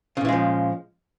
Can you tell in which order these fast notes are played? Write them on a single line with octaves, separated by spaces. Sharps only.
C#3 A#2 E3 G#3 F3